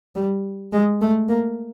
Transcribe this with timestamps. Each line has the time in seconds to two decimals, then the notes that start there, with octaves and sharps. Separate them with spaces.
0.15 G3
0.73 G#3
1.01 A3
1.29 A#3